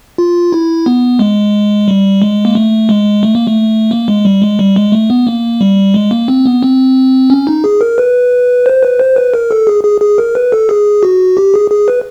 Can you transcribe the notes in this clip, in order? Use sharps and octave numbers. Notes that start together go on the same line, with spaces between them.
F4
E4
B3
G#3
G3
G#3
A#3
A3
G#3
A3
A#3
A3
A#3
G#3
G3
G#3
G3
G#3
A3
B3
A#3
G3
G#3
A#3
C4
B3
C4
C#4
D#4
G#4
A#4
B4
C5
B4
C5
B4
A#4
A4
G#4
G#4
G#4
A#4
B4
A4
G#4
F#4
G4
G#4
G#4
B4